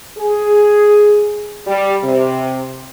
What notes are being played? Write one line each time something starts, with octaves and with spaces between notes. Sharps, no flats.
G#4
G3
C3